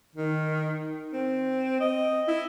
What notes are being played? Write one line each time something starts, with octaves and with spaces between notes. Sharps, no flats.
D#3
C4
D#5
E4